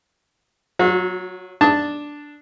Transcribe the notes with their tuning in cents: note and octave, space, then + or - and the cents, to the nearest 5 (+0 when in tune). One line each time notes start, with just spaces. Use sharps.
F#3 +0 F#4 -45
D4 +0 A5 +0 D#6 +25